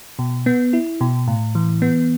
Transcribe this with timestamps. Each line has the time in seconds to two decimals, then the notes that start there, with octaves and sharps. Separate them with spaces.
0.19 B2
0.46 B3
0.73 E4
1.01 B2
1.28 A2
1.55 E3
1.82 B3